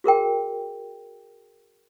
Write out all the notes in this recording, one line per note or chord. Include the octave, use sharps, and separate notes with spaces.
F#4 G#4 A#4 G5